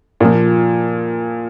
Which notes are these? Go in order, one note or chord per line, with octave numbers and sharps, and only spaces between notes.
A#2 F3